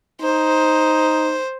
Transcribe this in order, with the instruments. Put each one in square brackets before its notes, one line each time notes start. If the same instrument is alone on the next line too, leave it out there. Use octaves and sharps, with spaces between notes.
[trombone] D#4 [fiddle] C5